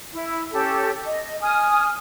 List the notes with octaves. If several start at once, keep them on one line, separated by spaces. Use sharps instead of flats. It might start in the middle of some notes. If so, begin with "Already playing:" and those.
E4
C#4 G4 A4
D#5
G#5 D#6 F6